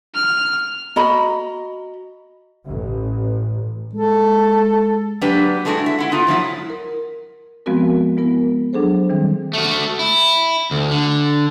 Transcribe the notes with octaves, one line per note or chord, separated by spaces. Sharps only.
F6
F#4 D#5 A#5 B5
A1
G#3 A4
F#3 A#3 D4 G4 B4
G#3 A3 D4 E4 F#4
E5
E4 F#5
A3 B3 F4 A#5
G#2 F3 F#3 E4
A#4
F3 G#3 B3 C4 F#4 A#4
G#3 B3 E4 A#4
F#3 D4 G#4 A4 C5
D#3 E3 G3 C4
A3 F#4
E4
D2
D3